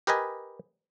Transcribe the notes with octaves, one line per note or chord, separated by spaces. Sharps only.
G4 A#4 B4 D#5 G#5